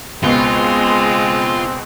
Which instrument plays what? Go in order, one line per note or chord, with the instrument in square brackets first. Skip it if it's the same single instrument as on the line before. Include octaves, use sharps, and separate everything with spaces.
[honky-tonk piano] C#2 B2 [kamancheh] G#3 [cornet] C4 [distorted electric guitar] F4